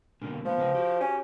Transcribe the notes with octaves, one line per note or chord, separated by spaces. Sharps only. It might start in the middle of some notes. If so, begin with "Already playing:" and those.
B2 D3 A#3
F3 A3 B3
C#3 B4 D#5
F#4 G4
C#4